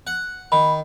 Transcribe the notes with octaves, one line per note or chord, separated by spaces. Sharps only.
F#5
D#3 B5